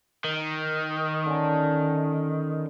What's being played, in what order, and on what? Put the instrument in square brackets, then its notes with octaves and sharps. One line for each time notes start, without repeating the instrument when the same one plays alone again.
[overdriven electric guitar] D#3
[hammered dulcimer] D3 C#4